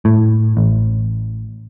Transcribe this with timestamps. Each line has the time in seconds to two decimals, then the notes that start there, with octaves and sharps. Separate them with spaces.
0.05 A2
0.57 A1